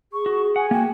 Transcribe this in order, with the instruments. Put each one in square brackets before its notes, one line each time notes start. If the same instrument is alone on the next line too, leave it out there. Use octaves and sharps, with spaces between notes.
[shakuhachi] G#4 [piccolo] C#6
[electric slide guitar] F#4
[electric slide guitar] F#5 [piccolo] G#5
[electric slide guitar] A#3 F#4 [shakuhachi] G5